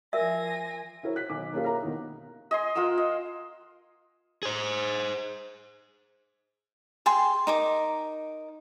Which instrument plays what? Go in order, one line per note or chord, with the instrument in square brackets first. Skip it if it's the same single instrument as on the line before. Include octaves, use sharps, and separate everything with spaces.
[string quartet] F3 G#5 A#6 [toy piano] A#4 E5
[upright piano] E4 F#4 A#4 C5 C#5
F#6 B6
B1 D#3 D6
A#3 C#4 F4 G4 A#4
A#4 C#5 E5 A#5
B2 D#3 D#4
[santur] D#5 G#5 C6
F4 A#4 F#5 E6
D#5
[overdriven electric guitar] G#4 C5
[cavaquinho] G#4 G5 C6
D#4 A#4 D6